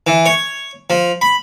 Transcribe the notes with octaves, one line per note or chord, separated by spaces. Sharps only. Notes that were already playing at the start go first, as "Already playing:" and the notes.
E3
C#5
F3
B5